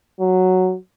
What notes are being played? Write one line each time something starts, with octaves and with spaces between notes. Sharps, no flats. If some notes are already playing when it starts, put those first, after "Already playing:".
F#3